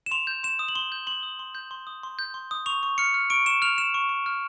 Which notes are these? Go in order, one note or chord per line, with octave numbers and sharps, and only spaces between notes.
E7
C6 F7
G6
C6 E7
D#6
F#7
C6 G7
G6
C6 F#7
D#6
C6
G6
C6
D#6
C6
G6
C6
D#6
C#6 F7
C#6
F6 C#7
F6
C#6 D7
C#6 E7
F6 F7
F6 E7
C#6
C#6
F6